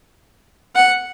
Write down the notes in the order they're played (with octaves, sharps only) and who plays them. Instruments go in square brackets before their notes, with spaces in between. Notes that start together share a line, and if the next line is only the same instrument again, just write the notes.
[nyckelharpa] F#5